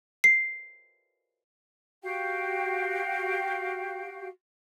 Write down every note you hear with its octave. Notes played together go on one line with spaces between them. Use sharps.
C7
F#4 G4 F5 G5